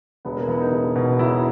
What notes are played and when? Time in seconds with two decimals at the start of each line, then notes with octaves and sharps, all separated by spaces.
0.25 E1 B3
0.37 A#3
0.48 E2 B3
0.61 D#4
0.72 E1
0.96 B2
1.19 E1 E4